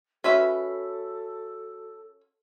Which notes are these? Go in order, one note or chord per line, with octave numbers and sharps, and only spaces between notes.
C#4 F#4 A4 B4 E5